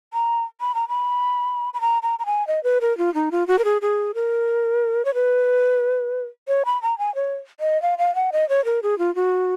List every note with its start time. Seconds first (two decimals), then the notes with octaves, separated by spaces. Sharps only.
0.13 A#5
0.61 B5
0.75 A#5
0.88 B5
1.74 B5
1.81 A#5
2.03 A#5
2.19 A#5
2.26 G#5
2.47 D#5
2.64 B4
2.81 A#4
2.98 F4
3.14 D#4
3.32 F4
3.47 F#4
3.59 A#4
3.65 G#4
3.82 G#4
4.15 A#4
5.05 C#5
5.14 B4
6.48 C#5
6.66 B5
6.82 A#5
6.99 G#5
7.15 C#5
7.60 D#5
7.82 F5
7.98 F5
8.15 F#5
8.32 D#5
8.49 C#5
8.65 A#4
8.83 G#4
8.98 F4
9.15 F#4